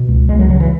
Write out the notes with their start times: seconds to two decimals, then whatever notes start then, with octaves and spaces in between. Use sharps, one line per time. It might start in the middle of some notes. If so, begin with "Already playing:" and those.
Already playing: B2
0.09 C#2
0.29 C#2 G#3
0.39 F#3
0.49 C#3 F#3
0.60 E3